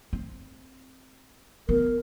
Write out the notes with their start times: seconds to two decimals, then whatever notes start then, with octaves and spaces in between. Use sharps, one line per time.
0.13 C4
1.69 B3 A#4